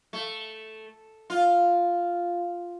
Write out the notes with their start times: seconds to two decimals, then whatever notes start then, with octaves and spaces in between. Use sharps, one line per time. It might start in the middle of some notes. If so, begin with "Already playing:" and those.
0.13 A3
1.30 F4